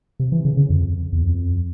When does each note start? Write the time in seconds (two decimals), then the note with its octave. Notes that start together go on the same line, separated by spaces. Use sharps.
0.20 C3
0.32 E3
0.45 C#3
0.57 C#3
0.70 F2
1.12 E2
1.21 F2